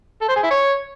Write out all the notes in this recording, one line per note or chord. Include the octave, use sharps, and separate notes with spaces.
A4
C5
G#4
E4
C#5